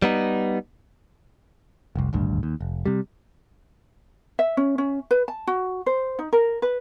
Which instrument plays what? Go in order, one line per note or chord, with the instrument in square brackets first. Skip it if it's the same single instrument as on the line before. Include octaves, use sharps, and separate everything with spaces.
[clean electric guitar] G3 B3 D#4
[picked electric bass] F1 C2
D#1 G#1 D2 G2
D#2
F1
C3 G3
[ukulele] E5
C#4
C#4
B4
A5
F#4
C5
D#4
A#4
B4